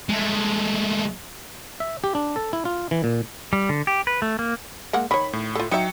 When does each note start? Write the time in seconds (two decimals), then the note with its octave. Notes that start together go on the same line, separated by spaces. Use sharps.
0.09 G#3 A3
1.80 E5
2.04 G4
2.15 D4
2.36 A4
2.53 E4
2.65 F4
2.91 E3
3.04 A#2
3.53 G3
3.69 D3
3.87 G4
4.07 B4
4.22 A3
4.39 A#3
4.93 G#3 A#3 F#5
5.11 D#3 C#5 B5
5.33 A2
5.55 F4 A4
5.71 F#3 D#4 E5 G5 C#7